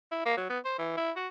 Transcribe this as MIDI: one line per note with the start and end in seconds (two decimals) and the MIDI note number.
0.11 0.21 64
0.25 0.36 58
0.37 0.49 54
0.50 0.59 59
0.65 0.74 72
0.78 0.94 52
0.97 1.11 64
1.16 1.28 66